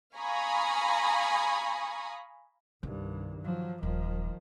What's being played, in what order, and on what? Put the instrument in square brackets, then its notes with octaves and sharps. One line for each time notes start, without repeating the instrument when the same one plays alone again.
[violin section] F5 G#5 A#5 B5 C#6 D#6
[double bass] C2 G2 [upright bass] D#3
[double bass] F3 F#3
[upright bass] D#1 [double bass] D#3 F3